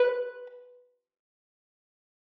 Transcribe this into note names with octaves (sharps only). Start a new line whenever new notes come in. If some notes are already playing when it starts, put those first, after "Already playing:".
Already playing: B4